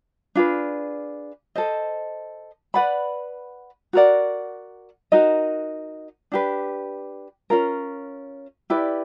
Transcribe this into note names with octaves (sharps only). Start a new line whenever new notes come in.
D4 F4 G#4 B4
A4 C5 D#5
B4 D5 F#5 B5
F#4 A#4 D5 F#5
D#4 F#4 A#4 D#5
D4 G4 B4
C#4 F4 A#4
E4 G4 B4 D5